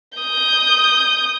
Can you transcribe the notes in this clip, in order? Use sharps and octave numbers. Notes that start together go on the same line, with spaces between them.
D#6 G6